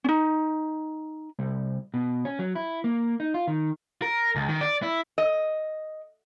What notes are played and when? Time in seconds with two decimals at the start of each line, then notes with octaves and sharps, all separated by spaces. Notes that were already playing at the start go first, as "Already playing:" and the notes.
0.04 C#4 D#4
1.39 C2
1.94 B2
2.25 C#4
2.39 F#3
2.55 E4
2.84 A#3
3.20 D#4
3.34 F4
3.47 D#3
4.02 A#4
4.36 C#2
4.48 D#3
4.61 D5
4.83 E4
5.18 D#5